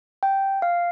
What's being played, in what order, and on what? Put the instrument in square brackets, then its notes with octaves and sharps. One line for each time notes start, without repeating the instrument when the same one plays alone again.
[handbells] G5
F5